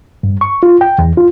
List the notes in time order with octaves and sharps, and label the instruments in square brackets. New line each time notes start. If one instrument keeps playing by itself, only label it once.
[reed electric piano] G2
C#6
F4
G5
E2
F4